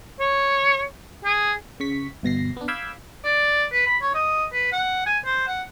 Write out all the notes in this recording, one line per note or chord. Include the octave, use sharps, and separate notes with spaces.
C#5
G#4
C#3 C#6 B6
G1 B2 A#6 C7
B3 D4
F5 B5 D6 E6 G6 G#6
D5
B4
B5
C#5
D#5
B4
F#5
G#5
C5
F#5